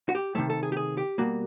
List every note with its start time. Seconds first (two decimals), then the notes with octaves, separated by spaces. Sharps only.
0.09 F#4
0.15 G4
0.35 C3 D#3 F#3 A3 A4
0.50 A4
0.63 G#4
0.72 G4
0.77 G#4
0.97 G4
1.18 B2 G3 A#3 F#4